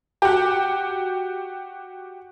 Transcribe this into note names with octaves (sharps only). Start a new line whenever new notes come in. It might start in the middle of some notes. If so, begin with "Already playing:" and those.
F#4 G4